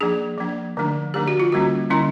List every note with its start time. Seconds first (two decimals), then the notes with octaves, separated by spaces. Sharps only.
0.01 F3 A#3 D4 G#4
0.38 F3 A#3 D4
0.77 D3 F3 A3 D4
1.14 D3 F3 A3 D4 G4
1.28 F#4
1.40 F4
1.52 D3 G3 A#3 C#4 F#4
1.90 D3 G3 A#3 C#4 E4